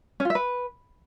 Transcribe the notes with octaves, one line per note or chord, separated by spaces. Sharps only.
C#4
F4
E5
B4